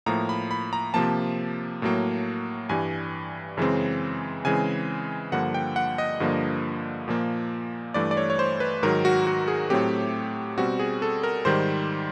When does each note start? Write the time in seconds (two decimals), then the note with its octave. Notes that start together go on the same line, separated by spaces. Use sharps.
0.06 A2 F3 A#3 A#5
0.29 B5
0.51 B5
0.73 A#5
0.94 C3 F3 A#3 A5
1.82 A2 F#3 A#3
2.69 G2 E3 G3 G#5
3.57 F#2 C#3 E3 G#3 C4
4.45 C#3 E3 G#3 C4 G#5
5.32 G2 D3 F3 A#3 F#5
5.54 G5
5.76 F#5
5.98 D#5
6.20 G2 D3 F3 A#3
7.08 A#2 F3 A#3
7.94 G2 E3 A3 D5
8.11 D5
8.17 C#5
8.30 C#5
8.39 C5
8.60 B4
8.83 G#2 D#3 F#3 A#4
9.05 F#4
9.27 F#4
9.48 G#4
9.70 A2 F#3 A3 C4 G4
10.58 B2 G3 C4 F#4
10.79 G#4
11.02 A4
11.23 A#4
11.45 G#2 D#3 G3 C5